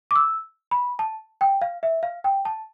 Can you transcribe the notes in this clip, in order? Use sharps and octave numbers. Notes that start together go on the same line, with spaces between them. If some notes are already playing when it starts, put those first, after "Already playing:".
D6
E6
B5
A5
G5
F5
E5
F5
G5
A5